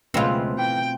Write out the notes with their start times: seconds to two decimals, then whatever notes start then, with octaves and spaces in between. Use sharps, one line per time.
0.14 C#2 B2 F#3 G#3 A3 C4 F4 B4
0.59 E3 G5